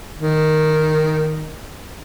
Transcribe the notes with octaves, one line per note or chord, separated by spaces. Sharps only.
D#3